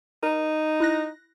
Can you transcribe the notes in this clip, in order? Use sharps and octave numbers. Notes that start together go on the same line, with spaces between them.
D#4 A#4
E4 F#6 A#6